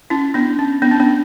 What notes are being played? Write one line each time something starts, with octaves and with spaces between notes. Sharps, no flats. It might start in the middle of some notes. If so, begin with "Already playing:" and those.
C#4 E4
B3 D4
C#4
B3 D4
C#4
B3 D4